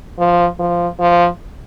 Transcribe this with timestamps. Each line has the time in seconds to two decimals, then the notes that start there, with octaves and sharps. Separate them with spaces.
0.19 F3
0.59 F3
1.00 F3